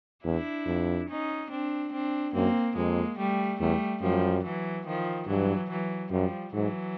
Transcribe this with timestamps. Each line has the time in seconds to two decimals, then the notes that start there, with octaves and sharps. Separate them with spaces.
0.24 E2 D4 E4
0.66 F2
1.09 C#4 D#4
1.50 C4 D4
1.92 C4 D4
2.34 F#2 A#3 C4
2.76 F2 G#3 A#3
3.19 G3 A3
3.60 E2 G3 A3
4.02 F#2 F3 G3
4.44 E3 F#3
4.87 D#3 F3
5.28 G2 E3 F#3
5.70 E3 F#3
6.12 F#2 F3 G3
6.54 G#2 E3 F#3